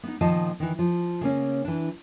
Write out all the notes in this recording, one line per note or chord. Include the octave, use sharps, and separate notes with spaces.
B3 D#4
A#2 D#3 F3 D#5 A5
D#3 E3
F3
C#3 A#3 C#4
E3 D4